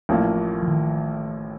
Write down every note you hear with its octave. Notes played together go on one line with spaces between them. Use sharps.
A1 A2 F3 A#3
F3
D#3